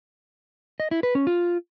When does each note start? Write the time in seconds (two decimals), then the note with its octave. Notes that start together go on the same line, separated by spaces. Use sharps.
0.80 D#5
0.91 E4
1.03 B4
1.15 C#4
1.27 F4